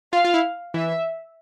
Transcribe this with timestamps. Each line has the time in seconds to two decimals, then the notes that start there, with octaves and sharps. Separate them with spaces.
0.13 F4 F5
0.25 F4
0.34 E4
0.74 E3 E5